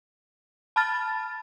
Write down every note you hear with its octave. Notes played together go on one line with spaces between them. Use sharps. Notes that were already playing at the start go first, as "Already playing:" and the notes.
A5 B5 F6 A6